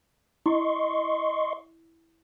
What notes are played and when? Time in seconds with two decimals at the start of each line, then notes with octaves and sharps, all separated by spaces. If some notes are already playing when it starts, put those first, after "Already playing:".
0.46 E4 D#5 C6 C#6